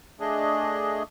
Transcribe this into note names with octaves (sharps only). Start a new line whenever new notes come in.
A3 D4 G#4 D#5